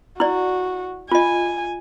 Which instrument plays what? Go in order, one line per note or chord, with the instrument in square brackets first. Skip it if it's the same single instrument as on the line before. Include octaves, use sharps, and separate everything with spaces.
[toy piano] E4 D5 [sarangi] F#4
[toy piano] F4 D#5 [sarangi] G#5